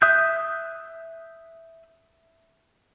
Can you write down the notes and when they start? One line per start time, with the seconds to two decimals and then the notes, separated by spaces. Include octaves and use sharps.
0.02 E5 D#6 F#6 G6